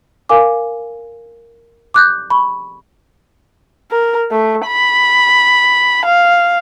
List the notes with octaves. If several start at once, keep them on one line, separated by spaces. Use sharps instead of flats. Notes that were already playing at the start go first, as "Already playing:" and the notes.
A#4 F5 G#5 D6
D6 F#6 G6
B5 C#6
A#4
A3
B5
F5